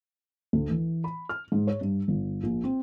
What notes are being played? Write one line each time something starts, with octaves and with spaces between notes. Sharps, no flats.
D2
E3
B5
F6
G#2
C#5
G2
G1
A#1
C4